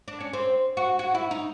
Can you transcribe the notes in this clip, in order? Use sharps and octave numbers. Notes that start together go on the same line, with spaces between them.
D4
C#4
C4
F#4
F#4
E4
D#4